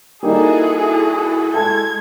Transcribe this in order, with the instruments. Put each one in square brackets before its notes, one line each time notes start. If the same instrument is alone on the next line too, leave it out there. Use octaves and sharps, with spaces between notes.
[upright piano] G3 A#3 D#4 [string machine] E4 F#4 A4 [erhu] G#4
[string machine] G#3 [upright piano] A4 G#5 A5 [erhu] G#6